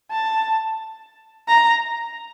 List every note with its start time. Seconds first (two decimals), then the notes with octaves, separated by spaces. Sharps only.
0.12 A5
1.48 A#5